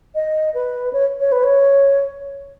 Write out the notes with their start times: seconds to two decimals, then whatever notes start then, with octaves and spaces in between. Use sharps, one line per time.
0.15 D#5
0.54 B4
0.93 C#5
1.20 C#5
1.32 B4
1.43 C#5